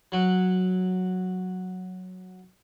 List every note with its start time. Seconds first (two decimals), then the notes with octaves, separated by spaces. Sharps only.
0.12 F#3 F#4